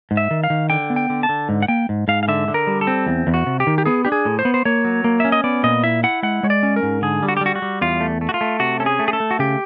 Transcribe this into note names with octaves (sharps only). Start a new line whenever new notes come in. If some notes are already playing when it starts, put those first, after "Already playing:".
G#2
E5
D#3
F5
D#3
D3 G5
B3
G5
D3
A5
D3
G#2
F#5
A#3 G5
G#2
G#2 F5
F5
D3 E5
D3
A#4
G3
A4
C4
E2
E2
F#4
C3
G4
D#3
G4
B3 G#4
D4 G4
G#4
A2
C5
B3
C5
A#3 C#5
F#3
A#3
C#4 E5
D#5
B3 D5
A#2 D#5
E4 E5
E4 F#5
G#3 F#5
G#3 C#5
D5
C#4
A#4
G#2
D3 G#4
G3
F#4
G4
G3 F#4
F#4
G3
E2 F4
A3
A3
F#4
F4
A3
C3 F#4
C#4 A4
G#4
A3
G#4
A4
A3
F#4
C#3 G4